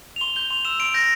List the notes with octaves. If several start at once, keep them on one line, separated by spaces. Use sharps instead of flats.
F7
C6 G7
G6 G7
C6 F7
E6 E7
C6 D7
G6 A#6